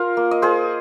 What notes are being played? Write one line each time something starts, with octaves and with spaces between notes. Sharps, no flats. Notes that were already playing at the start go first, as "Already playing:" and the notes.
Already playing: F4 A#4 F5
A#3
D#5
F4 G#4 C5